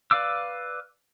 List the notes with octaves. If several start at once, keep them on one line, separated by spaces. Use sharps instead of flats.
B4 D5 F5 D6 E6